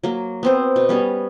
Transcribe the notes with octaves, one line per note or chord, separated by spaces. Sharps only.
F#3 A#3
B3 C4 C5
B2
G3 B3 C#4